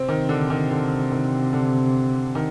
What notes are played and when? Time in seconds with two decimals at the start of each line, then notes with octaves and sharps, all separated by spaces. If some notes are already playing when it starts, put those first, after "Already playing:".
Already playing: C3 C4
0.08 D#3
0.29 D3
0.50 D#3
0.71 D3
1.12 D#3
1.53 D3
2.35 D#3